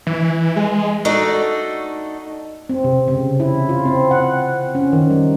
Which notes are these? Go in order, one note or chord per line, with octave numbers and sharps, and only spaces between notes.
E3
G#3
A3 D4 D#4 F#4 A4 D5
C4
C3
C#3
E4
F4
C4
F#5
C#4
D#3
G3